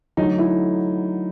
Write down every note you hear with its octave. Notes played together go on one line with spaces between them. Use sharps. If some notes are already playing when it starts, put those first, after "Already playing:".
D3 F#3 A3 D#4
E4